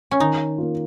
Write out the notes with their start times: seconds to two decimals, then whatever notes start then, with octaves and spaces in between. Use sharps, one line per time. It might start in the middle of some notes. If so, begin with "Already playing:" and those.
0.11 C#4
0.20 D#3 D#4
0.58 A#3 F4